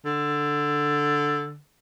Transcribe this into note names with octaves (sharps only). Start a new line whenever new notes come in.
D3